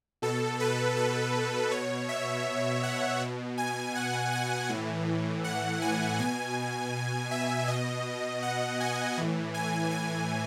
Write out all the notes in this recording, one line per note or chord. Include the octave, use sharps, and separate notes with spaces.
B2 A4
B4
A4
B2 C#5
E5
F#5
B2
G#5
F#5
G#5
A2 E3
F#5
G#5
B2 G#5
E5
B2 D#5
F#5
G#5
A2 E3
G#5
G#5